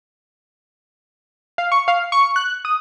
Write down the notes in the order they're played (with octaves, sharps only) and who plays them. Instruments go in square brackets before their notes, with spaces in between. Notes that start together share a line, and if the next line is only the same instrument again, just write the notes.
[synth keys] F5
C#6
F5
C#6
F#6
D#6